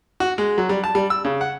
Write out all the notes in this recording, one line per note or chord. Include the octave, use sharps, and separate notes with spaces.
F#4
G#3
F#3
G3
A5
G3
E6
C#3
F#5